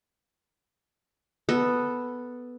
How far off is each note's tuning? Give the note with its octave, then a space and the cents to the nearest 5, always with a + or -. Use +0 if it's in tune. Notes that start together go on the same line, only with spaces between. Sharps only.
B3 +0 A4 +0